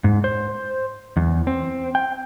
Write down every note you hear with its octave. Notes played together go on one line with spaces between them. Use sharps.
G#2
C5
E2
C4
G5